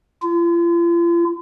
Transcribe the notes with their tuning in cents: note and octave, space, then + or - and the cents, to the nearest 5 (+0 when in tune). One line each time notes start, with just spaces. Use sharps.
F4 -40